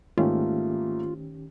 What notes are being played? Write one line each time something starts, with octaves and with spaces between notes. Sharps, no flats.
G#2 D#3 A3 A#3 C#4 F4 G4